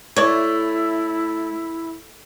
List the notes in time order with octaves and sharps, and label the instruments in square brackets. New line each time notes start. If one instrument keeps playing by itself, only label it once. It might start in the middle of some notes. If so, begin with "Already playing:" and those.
[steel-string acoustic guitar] A3 [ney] E4 [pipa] C#5 D5